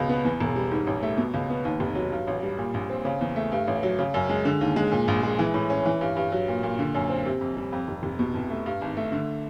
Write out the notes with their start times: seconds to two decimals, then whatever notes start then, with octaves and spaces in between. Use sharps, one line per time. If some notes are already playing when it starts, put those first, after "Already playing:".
Already playing: C#2 B2
0.09 B3
0.25 E2
0.40 E1
0.56 G3
0.71 G#2
0.87 A1
1.03 A3
1.17 B2
1.34 C#2
1.50 B3
1.65 D#2
1.80 F1
1.95 F#3
2.12 G2
2.27 A1
2.43 G3
2.58 A#2
2.74 A#1
2.89 C4
3.05 C#3
3.21 E2
3.36 A3
3.52 G2
3.67 A1
3.83 F#3
3.99 C#3
4.14 F#2
4.29 G#3
4.45 D3
4.61 D#2
4.76 G#3
4.91 A#2
5.08 A#1
5.23 G#3
5.39 E3
5.54 A2
5.70 C#4
5.85 E3
6.01 G2
6.16 G2
6.32 F#3
6.48 A#2
6.63 A#2
6.79 D3
6.95 F#2
7.09 C4
7.25 C3
7.41 F2
7.57 G3
7.72 F2
7.88 F1
8.03 F1
8.19 B2
8.34 C2
8.50 A3
8.66 G2
8.81 G#1
8.97 A3
9.12 D3